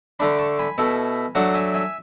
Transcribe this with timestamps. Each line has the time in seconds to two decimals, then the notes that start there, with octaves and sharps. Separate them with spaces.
0.19 D3 A3 D4 B5 D6
0.39 A5 C#6
0.59 G#5 B5
0.78 B2 A3 E4
1.35 F#3 A3 D4 F#5 A5
1.54 E5 G#5
1.74 E5 G#5